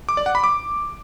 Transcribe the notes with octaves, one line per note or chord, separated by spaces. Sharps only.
D6
D5
F#5
B5
D6